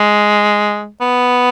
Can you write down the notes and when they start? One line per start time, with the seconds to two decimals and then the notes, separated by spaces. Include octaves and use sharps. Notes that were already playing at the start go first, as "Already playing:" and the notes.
Already playing: G#3
1.01 B3